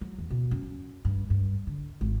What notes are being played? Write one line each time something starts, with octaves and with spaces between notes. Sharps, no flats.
F#3
E2
B2
F#2
G2
G2
D3
G#1